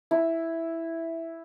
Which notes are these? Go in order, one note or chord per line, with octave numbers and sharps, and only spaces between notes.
E4